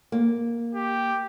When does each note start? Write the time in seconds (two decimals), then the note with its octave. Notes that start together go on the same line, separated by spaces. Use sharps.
0.12 A#3
0.75 G4